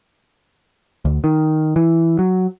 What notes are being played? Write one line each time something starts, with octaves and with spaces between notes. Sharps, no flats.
D2
D#3
E3
F#3